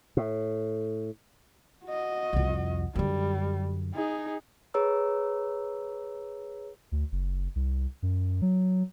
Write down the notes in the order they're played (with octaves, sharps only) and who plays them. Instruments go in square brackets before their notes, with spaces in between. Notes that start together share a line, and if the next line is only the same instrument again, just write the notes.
[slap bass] A2
[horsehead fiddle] F#4 D#5
[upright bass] C2 F2
[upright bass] F#2 D3 [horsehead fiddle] G3
[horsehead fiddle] D#4 G#4
[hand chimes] G#4 B4 C#5 A#5 E6
[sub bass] D2
F#1
C2
F#2
F#3